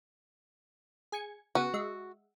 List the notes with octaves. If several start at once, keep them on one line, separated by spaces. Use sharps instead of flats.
G#4 G#6 C#7
C#3 B3 F#4
G#3 E5